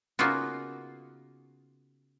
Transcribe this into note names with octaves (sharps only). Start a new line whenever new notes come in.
C#3 A#3 B3 D#4 F4 F#4